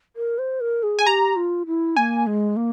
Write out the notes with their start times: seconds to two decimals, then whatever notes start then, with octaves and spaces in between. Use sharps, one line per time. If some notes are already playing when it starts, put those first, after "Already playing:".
0.16 A#4
0.38 C5
0.60 A#4
0.83 G#4
0.99 G#5
1.06 G4 A#5
1.36 F4
1.67 E4
1.96 A#3 G#5
2.27 G#3
2.56 A#3